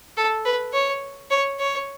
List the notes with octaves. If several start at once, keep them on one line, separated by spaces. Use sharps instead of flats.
A4
B4
C#5
C#5
C#5